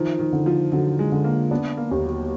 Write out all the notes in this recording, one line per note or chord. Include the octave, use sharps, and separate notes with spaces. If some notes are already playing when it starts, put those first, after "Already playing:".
Already playing: D#3 F3
D#3
D3
F3
D3 F#3
G#3
D3
A#3
B3 D4
A#3
D#2
F#3